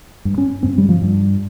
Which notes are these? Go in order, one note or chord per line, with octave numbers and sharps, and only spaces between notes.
G2
C#4
G2 C4
G3
F3
G2